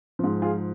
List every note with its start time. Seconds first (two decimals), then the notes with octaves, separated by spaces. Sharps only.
0.19 G#2 F3
0.42 F4 G#4